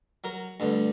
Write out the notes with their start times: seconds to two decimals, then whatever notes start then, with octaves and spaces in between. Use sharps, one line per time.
0.24 F#3 A#4
0.60 D2 G2 D3